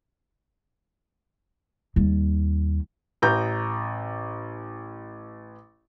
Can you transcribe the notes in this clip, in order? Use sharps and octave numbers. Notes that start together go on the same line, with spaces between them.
D#2 G3
A1 A#5 G6